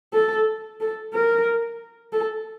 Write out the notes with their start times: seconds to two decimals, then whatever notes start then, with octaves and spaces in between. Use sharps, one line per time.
0.13 A4
0.81 A4
1.14 A#4
2.13 A4